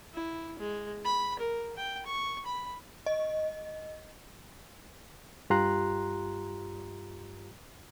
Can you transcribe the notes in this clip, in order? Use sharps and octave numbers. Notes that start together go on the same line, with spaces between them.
E4
G#3
B5
A#4
G5
C#6
B5
D#5
G2 F4 G4 A#5 C6 F#6